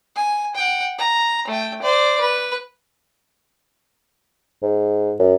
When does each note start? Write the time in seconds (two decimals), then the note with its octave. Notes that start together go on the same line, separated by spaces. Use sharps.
0.16 G#5
0.55 F#5 G5
0.98 A#5
1.48 A3 G5
1.82 C5 D5
2.20 B4
4.63 G#2
5.20 F#2